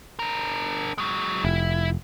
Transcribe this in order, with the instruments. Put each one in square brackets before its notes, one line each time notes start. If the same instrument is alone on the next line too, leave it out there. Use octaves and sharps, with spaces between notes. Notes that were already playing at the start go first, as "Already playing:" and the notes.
[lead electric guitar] D4 A#4
F#3 G#3
[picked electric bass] F1 [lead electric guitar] E4